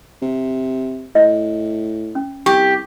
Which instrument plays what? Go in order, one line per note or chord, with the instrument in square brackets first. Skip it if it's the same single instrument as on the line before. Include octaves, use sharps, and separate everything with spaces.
[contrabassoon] C3
[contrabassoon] A2 [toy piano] D#5
[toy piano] C#4
[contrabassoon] C2 [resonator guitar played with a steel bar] G4 [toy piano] C#6